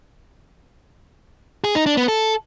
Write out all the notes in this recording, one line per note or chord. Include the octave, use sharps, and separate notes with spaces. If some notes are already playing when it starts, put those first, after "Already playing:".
G#4
D#4
D4
B3
A4